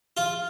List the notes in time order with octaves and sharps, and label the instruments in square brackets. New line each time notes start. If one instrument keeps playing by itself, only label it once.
[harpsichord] F4